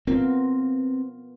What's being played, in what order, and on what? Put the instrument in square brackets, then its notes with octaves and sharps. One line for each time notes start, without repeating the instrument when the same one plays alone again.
[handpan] B3 F4 A#4 [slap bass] C4